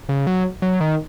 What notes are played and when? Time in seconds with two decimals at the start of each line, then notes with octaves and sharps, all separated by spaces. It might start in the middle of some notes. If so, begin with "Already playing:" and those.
0.09 C#3
0.27 F#3
0.62 F#3
0.80 D#3